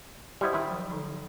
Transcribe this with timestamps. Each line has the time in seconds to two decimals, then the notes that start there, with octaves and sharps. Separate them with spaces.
0.41 G3 E4 C5 D#5 F#5 C6
0.53 D#3 E4 G5 A#5 C6
0.68 F3 F#3
0.91 D3 F3 D#4